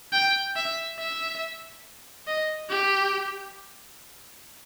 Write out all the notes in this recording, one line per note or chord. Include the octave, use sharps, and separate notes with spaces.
G5
E5
E5
D#5
G4